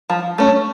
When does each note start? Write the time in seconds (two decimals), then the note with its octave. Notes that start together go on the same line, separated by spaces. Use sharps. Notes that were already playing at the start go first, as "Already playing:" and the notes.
0.10 F3
0.38 A3 C#4